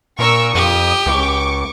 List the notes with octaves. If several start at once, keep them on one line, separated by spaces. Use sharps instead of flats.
A#2 D4 A#4 C#6 E6
F2 G4 D#6
C#2 C#6 D6